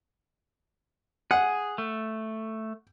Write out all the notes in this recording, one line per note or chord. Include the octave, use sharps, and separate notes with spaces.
G#4 F#5
A3